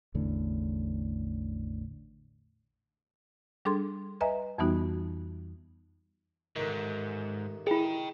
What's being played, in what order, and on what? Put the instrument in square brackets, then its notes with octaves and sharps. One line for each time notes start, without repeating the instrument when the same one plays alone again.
[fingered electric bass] A1 E2 A2 D3
[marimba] G3 D4 G#4 A4 C6
B4 D#5 E5 G#5 A#5
F2 E3 G3 B3 D#4 F#4
[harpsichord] A1 D#3 [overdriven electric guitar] G#2
[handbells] E4 G#4 [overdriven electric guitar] D#5 G5